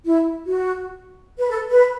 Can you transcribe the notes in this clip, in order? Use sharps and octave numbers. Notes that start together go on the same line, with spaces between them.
E4
F#4
B4
A4
B4